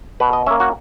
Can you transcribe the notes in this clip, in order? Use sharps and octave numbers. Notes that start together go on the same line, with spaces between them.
B2 B4
D#5
A#3 C#4 E5
F#4